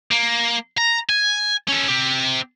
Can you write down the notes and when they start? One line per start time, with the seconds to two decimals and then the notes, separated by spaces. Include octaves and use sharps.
0.12 A#3
0.78 A#5
1.09 G#5
1.69 C#4 A4
1.88 C4 G4